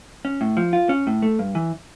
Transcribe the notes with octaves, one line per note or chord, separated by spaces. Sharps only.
C#4
A2
F3
F4
C#4
A2
A3
G2
E3